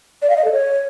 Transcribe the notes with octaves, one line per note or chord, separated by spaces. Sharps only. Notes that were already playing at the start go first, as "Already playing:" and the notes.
D5
F5
D#5
A4
C#5